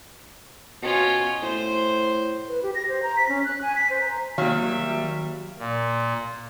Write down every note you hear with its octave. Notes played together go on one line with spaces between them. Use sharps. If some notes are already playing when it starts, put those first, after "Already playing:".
B2 C#4 F4
A2 C5
B4
G4
A#6
C5
A#5
B6
C#4
F#6
G#5
B6
C5
A#5
D#3 F#3 G3 A#3 E5 F5
A#2